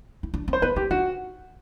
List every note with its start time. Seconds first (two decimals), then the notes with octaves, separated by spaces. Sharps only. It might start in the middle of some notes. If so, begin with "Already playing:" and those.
0.23 E4
0.34 D4
0.48 C4
0.53 C5
0.62 B3 B4
0.76 C4 G4
0.91 D4 F#4